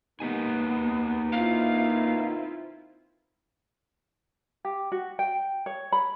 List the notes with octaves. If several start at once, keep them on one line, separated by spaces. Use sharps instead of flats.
B2 D#3 A#3 B3 D#4 G4 G#5
C4 E4 F4 F5
G4
F#4
G5
C#5
B5